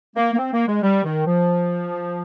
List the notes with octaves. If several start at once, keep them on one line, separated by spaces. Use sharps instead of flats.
A#3
A#3
C4
A#3
G#3
G3
D#3
F3